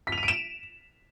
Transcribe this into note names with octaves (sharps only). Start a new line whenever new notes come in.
B6
F7
D#7
D7
E7